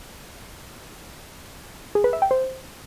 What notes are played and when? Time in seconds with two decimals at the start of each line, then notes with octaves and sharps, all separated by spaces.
1.95 G#4
2.04 B4
2.13 E5
2.22 G5
2.31 C5